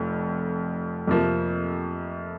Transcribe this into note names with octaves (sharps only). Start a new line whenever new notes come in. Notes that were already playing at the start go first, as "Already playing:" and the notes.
Already playing: F1 F2
F2 C3 F3 A#3